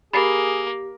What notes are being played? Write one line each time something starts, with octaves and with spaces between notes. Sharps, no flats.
A#3 G4 G#4 B5 A6 C7